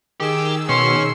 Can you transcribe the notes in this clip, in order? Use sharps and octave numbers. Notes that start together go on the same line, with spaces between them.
D#3 G4 G#4 E6
B2 C#4 C6